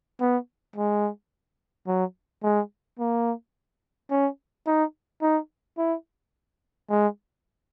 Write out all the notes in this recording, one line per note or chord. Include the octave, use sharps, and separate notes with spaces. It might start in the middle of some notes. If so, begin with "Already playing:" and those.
B3
G#3
F#3
G#3
A#3
C#4
D#4
D#4
E4
G#3